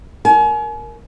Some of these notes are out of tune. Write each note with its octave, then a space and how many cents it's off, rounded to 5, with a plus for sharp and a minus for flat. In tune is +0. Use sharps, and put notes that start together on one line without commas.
A#4 +0 G#5 +40